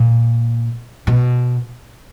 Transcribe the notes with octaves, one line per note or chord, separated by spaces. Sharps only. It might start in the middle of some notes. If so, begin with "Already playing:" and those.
Already playing: A#2
B2